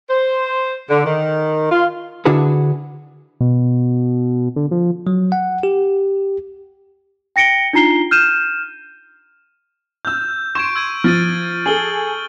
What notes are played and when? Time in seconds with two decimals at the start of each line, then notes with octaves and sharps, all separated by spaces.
0.09 C5
0.90 D3
1.05 D#3
1.70 F4
2.25 D3 D4 E4 F#4 G#4 B4
3.41 B2
4.56 D3
4.71 F3
5.07 F#3
5.32 F#5
5.63 G4
7.36 G5 A#6 C#7 D7 G7
7.73 D4 D#4 F4 A#5 C7 G7
8.11 F6 G6 D#7 E7
10.05 E6 F6 G6
10.55 C6 C#6 G#6 D7 E7
10.76 E6 G#6 D#7
11.04 F3 F6 A6 D#7
11.66 G#4 A4 F#7 G7